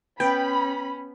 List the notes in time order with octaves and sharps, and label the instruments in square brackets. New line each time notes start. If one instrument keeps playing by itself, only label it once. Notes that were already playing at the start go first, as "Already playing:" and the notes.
[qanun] B3 [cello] C#4 [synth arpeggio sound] G5 [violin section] B5